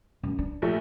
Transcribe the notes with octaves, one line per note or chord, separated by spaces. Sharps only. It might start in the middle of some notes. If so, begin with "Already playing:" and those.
F#2
D4
A#1 A3